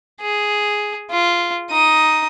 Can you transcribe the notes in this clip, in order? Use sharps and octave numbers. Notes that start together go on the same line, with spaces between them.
G#4
F4
D#4 D#6